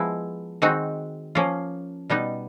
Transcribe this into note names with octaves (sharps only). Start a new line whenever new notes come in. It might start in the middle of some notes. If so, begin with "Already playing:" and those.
Already playing: F3 G#3 B3 E4
D#3 G#3 C4 D#4 F#4
F3 A#3 C#4 F4
B2 G3 B3 D#4